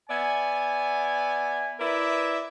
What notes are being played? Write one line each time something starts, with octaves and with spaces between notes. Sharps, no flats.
B3 D5 E5 G#5
E4 A#4 B4 D5 E5